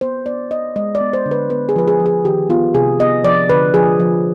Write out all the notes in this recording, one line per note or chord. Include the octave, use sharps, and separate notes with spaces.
B3 C5
B3 D5
B3 D#5
G#3 D#5
D5
B3
C5
D3
B4
B3 B4
G#4
F3 B4
G#4
F3
G#4
D#3 G4
B3 F4
C3 G#4
B3 D#5
F3 D5
D3 B4
F3 G#4
F3